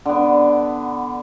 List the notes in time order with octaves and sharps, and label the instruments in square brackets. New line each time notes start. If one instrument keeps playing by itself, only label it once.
[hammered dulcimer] D3 B3